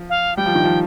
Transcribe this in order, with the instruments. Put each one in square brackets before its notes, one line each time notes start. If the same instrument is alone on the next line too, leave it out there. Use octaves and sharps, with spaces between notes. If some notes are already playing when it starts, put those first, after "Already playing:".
Already playing: [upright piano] F3
[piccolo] F5
[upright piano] G3 [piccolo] G5
[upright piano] F3
D#3
F3